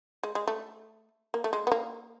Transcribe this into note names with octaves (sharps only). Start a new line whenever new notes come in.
G#3
G#3
A3
A#3
A3
G#3
B3
A#3